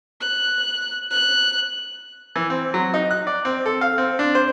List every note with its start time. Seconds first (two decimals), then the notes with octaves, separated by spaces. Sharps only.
0.20 F#6
1.10 F#6
2.36 E3
2.50 C4
2.74 F#3
2.94 D#4
3.11 F#6
3.27 D5
3.45 C4
3.66 A4
3.81 F5
3.98 C4
4.19 D4
4.35 C5